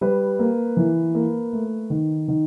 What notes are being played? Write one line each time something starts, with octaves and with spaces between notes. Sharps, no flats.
G3 B4
A#3
E3
A#3
A3
D#3
D#3